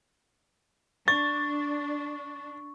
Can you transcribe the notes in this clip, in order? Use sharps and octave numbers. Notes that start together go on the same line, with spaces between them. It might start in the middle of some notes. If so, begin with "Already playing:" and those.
D4 C#6 A6